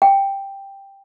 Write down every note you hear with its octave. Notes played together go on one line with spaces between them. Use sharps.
G5